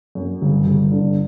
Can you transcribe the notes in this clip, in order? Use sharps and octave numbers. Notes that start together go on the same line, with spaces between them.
F#2
G1
G1
D3